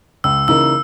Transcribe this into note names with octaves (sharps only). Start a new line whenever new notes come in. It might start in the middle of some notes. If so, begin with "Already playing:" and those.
C#2 E6
C#3 E3 A#3 D#4 E6